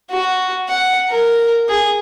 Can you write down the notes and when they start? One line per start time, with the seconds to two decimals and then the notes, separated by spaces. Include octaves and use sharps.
0.11 F#4
0.69 F#5
1.10 A#4
1.69 G#4